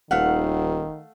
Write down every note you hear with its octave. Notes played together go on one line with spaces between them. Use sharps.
D#1 D#3 A3 F5 F#5